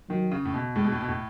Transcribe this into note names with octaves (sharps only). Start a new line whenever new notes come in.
D#3 F#3
C#3
A2
B2
A2 G#3
B2
A2
B2
A2